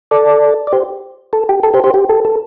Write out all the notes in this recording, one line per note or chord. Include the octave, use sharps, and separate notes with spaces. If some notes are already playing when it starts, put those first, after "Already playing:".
A4 D5
D5
G4 C5
A4
G4
A4
G4 C5
G4 C5
G4
A4
A4